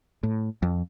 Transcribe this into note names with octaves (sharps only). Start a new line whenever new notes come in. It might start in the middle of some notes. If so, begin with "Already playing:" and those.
A2
F2